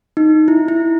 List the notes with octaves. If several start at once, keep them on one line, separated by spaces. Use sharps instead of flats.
D#4
E4
E4